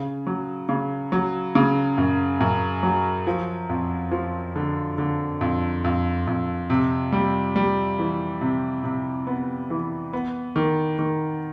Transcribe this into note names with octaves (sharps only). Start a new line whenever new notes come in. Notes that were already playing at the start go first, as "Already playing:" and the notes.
Already playing: C#3
F#3
C#3
F#3
C#3
F#2
F#2
F#3
F3
F2
F3
D3
D3
F2
F2
F2
C3
G3
G3
E3
C3
C3
B3
E3
B3
D#3
D#3